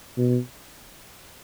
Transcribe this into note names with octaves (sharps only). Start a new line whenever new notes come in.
B2